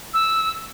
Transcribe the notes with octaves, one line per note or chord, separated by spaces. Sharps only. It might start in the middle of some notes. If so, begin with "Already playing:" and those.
E6